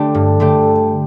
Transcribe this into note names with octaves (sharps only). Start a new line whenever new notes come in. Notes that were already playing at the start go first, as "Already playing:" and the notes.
Already playing: D3 A3 D4 G4
G2
D3 A3 G4